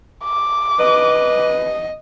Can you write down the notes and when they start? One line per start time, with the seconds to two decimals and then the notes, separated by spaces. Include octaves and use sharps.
0.24 D6
0.79 B4 D#5